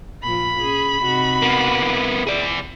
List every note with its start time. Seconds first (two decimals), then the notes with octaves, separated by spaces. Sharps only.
0.23 A#2 F3 B5
0.60 C#4 G#4
1.02 C3 D#4 F#4
1.42 A#3 B3
1.79 E4
2.27 G#4 D5